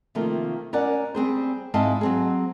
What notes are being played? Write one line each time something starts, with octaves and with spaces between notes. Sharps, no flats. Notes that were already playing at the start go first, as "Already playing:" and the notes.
C3 D#3 F3 A3 A#3
C#4 A#4 D5 F#5
G3 C4 G#4 C5
G#2 C4 E4 D#5 F5 A5
F#3 C4 G#4